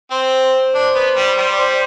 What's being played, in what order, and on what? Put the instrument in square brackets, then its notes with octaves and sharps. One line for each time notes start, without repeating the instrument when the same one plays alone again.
[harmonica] C4 [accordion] C5
[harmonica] D4
B3
G3
G3
[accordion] D5
C5